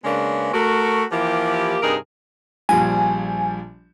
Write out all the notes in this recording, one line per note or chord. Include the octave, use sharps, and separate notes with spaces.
C#3 G#3 A#3 B3 C#4 D4
A3 F#4 A#4
E3 F3 A#3 E4 G4
G2 C3 D#4 G#4 A#4
A#1 F3 G3 G#5